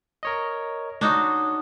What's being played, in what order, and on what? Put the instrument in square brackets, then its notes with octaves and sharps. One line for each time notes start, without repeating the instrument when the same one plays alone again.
[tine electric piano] A#4 C#5 D#5
[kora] D4 D#4 F#4 [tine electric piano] C#5